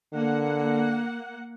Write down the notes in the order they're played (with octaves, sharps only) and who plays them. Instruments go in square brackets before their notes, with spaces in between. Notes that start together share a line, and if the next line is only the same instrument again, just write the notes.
[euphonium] D3 [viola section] A#3 F#5